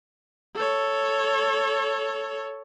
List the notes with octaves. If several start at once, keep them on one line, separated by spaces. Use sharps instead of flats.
A4 C#5